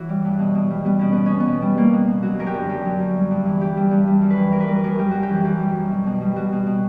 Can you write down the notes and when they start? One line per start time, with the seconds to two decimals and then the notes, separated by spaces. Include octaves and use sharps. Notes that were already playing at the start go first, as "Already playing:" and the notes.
Already playing: E3 E4 F#4 C#5
0.09 G3
0.25 G2
0.39 B2
0.55 B2
0.70 G3
0.85 G3 B3
0.99 B2 C#4
1.12 B2 B3
1.26 C#4
1.31 B2
1.40 B3
1.46 B2
1.62 G3
1.77 G3 A#3
1.92 B2
2.08 B2
2.23 F#3 F#4
2.39 F#2 A#4
2.47 G4
2.54 D3
2.69 F#2 G4
2.85 F#3
3.00 F#2
3.15 G3
3.31 G2
3.46 E3
3.60 G2 G4
3.77 G3
3.91 G2
4.07 G3
4.22 F#2
4.30 B4
4.37 E3
4.52 F#2 A#4
4.60 B4
4.68 G3 A#4
4.76 B4
4.84 F#2 A#4
4.98 G3 G4
5.11 F#2 F#4
5.23 G4
5.30 E3
5.44 F#2 G4
5.60 G3
5.75 F#2
5.90 B2
6.06 B2
6.21 G3
6.36 G3 F#4
6.52 B2
6.67 B2